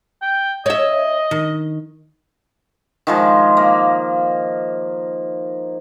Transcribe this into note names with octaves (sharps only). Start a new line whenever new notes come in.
G5
C#5 D#5 E5
D#3
D#3 F3 G#3
A#3